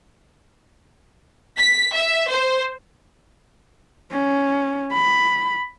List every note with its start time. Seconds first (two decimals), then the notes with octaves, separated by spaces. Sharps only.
1.59 B6
1.95 E5
2.28 C5
4.12 C#4
4.93 B5